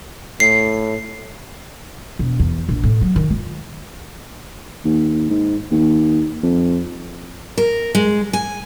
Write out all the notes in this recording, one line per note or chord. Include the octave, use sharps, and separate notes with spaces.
A2 C7
E1
E2
A#1
A2
F#3
D#3
F4
D#2
G#2
D#2
F2
A#4
G#3
G#5